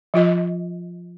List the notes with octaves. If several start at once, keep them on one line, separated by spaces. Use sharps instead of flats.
F3 F4 D#5